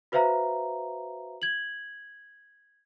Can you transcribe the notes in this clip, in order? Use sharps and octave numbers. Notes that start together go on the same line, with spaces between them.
F#4 B4 C5 E5 F5 A#5
G#6 F#7